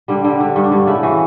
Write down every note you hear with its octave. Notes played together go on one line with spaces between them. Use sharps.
D3 G3
D3 G3
D3
G2
D4
G2
C#3 E4
E3 F#4